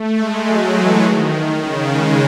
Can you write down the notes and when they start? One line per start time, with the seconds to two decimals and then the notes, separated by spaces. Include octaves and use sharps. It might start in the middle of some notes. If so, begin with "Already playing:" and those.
Already playing: A3
0.18 G#3
0.46 F#3
0.75 E3
1.03 D#3
1.60 C#3
1.89 G#3